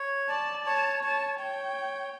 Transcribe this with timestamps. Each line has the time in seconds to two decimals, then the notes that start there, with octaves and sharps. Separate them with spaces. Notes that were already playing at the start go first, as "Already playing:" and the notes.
Already playing: C#5
0.29 D5 A5
0.66 C#5 A5
1.03 C#5 A5
1.39 C#5 G5